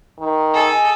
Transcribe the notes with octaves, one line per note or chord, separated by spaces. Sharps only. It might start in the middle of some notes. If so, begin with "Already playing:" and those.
D#3
G#4 A4 D#5 G#5